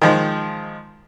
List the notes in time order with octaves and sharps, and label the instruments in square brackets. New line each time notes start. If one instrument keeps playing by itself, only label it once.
[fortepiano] D#3 F3 G#3